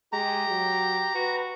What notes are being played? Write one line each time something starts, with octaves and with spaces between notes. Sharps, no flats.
G#3 G4 A#5
F#3
F#4 B4